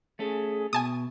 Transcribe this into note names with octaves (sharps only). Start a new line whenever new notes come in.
A3 C#4 G#4 A4
B2 E5 G#5 A5 D#6